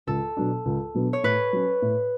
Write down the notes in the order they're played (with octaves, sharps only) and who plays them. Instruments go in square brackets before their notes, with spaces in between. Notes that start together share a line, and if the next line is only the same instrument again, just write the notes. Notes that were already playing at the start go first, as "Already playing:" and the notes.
[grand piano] C#2 [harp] A4
[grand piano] B2 F#3 B3 D4
C#2
B2 F#3 B3 D4
[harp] C#5
[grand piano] A2 [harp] B4
[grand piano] F#3 C#4
A2